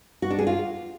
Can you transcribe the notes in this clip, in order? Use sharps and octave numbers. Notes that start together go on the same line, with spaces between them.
F#4
D4
G#4
F4